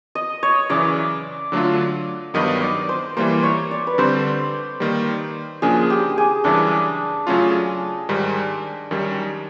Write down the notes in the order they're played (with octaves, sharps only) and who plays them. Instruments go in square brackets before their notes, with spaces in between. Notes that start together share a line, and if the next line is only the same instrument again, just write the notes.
[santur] D#5
C#5
[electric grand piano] F#2 C#3 E3 [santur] D5
[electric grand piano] D3 F#3 A3 D4 F4
[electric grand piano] G2 D#3 F#3 B3 [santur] D#5
[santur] D5
C5
[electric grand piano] E3 G3 A#3 [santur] C5
[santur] C#5
D5
B4
[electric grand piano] D3 G3 C4 [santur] C5
[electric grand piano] D#3 G3 A#3
[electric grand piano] C#3 F3 A#3 D4 [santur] G#4
[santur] G4
G#4
[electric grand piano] F#2 C#3 E3 G3 [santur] D4
[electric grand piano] C#3 F#3 A3 C#4 F4
G#2 D#3 G3
F#2 D#3 G3